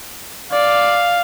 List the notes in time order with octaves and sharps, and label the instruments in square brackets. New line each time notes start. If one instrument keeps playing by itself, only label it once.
[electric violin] D5 [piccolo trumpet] F5